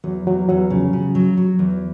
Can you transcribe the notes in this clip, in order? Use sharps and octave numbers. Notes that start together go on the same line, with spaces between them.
E2 F#3
E2 F#3
E2 F#3
C#3 F3
C#3
F#3
F#3
E2